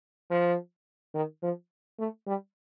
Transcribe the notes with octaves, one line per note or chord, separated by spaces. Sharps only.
F3
D#3
F3
A3
G3